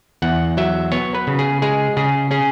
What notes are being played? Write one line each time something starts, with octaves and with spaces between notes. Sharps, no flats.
E2 F#5
F#3 E5
B3 C#5
B4
C#3
G#4
G#3 G#4
C#3 G#4
C#4 G#4